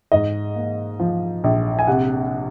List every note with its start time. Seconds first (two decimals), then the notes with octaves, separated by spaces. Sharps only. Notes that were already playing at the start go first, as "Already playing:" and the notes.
0.12 G#2 D#5
0.56 A#3
1.00 F3
1.44 A#1
1.79 G#5
1.87 C3 F#5